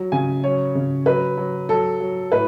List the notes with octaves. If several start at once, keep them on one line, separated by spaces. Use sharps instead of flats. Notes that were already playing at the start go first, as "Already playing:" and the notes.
Already playing: F#3
C#3 G#5
F#3 C#5
C#3
F#3 B4
F#3
F#3 A4
F#3
A2 B4